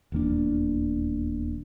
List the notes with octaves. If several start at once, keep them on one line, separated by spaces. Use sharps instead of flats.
D#1 E2 A#3 D4